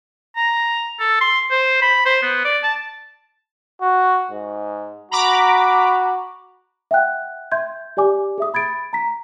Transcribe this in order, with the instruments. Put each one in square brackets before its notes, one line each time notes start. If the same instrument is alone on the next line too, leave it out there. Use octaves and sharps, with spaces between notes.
[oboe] A#5
A4
C6
C5
B5
C5
B3
D5
A5
[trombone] F#4
G#2
[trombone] F#4 [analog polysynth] A#5 B5 D6
[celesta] E5 F#5 G5 F#6
E5 C6 G6 G#6
G4 D5 G#5 D6
G#4 E5 D#6
B5 G#6 A6 D7
A#5 B6